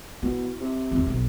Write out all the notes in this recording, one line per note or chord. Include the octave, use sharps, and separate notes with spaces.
B2 E4
C3
D#2 C4
B1